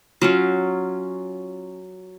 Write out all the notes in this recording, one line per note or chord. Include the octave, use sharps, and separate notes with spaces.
F#3 C#4 F4